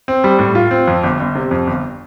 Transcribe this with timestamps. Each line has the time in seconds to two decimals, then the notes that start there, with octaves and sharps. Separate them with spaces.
0.08 C4
0.24 G3
0.39 A2
0.55 F4
0.71 C4
0.87 F2
1.04 G1
1.20 G1
1.35 C3
1.51 F2
1.67 G1